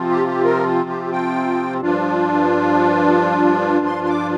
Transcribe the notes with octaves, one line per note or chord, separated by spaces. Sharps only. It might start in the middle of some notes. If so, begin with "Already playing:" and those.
Already playing: C3 F3 C4 F4
G4
G4
A#4
G4
G5
G2 F3 D4 F4
C6
C6
D6